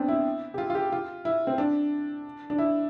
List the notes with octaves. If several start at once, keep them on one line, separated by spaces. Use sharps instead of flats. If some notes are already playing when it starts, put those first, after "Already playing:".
Already playing: B3 C4 D4
E4
G4
F4
F4
G4
F4
E4
C4
D4
D4
E4